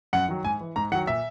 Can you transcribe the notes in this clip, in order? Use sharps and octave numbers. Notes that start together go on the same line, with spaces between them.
F#2 F#5
D#3 F#3
G#2 G#5
E3
G#2 A#5
D#3 F#3 F#5
A#2 E5